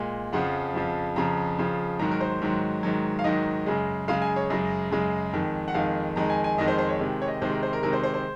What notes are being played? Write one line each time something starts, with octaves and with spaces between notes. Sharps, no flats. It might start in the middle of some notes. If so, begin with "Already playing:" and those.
Already playing: A#2 G#3
F2 C#3 F3 F#5
F2 C#3 F3
F2 C#3 F3 A#5
F2 C#3 F3
G#2 D#3 F#3 A#5
A#4
C5
G#2 D#3 F#3
G#2 D#3 F#3
F5
G#2 D#3 F#3 D#5
F#2 C#3 G#3
F#2 C#3 G#3 F5
G#5
C#5
F#2 C#3 G#3 D#5
F#2 C#3 G#3
F2 D#3 G#3
F#5
F2 D#3 G#3 F5
F2 D#3 G#3 A#5
G#5
G#5
F2 D#3 G#3 D#5
C5
C5
C#5
C3 D#3 G#3
C#5
D#5
C3 D#3 G#3 C5
A#4
C5
A#4
C3 D#3 G#3 A#4
C5
C5
C5